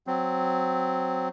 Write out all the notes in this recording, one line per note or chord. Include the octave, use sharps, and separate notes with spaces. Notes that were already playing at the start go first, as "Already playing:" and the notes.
F#3 C4